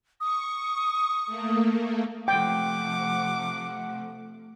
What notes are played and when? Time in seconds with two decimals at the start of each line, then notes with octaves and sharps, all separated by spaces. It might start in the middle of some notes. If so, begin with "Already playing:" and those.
0.20 C#6 D#6
1.26 A3 A#3
2.28 C3 F3 A3 F#5 G5 D6